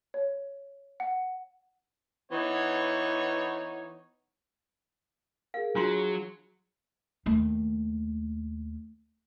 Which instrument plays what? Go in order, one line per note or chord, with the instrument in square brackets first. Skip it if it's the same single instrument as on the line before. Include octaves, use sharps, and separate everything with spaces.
[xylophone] C#5
F#5
[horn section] E3 B3 D#4 C#5
[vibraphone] G#4 A#4 [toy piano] F5
[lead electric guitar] F#3 [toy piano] D4 F4 C6 [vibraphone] G#4
[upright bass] D#2 A3